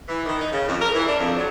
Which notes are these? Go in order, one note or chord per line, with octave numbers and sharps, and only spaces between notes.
E3
D#3
D#4
C#3
F2
A#4
E3
D4
F2
F#3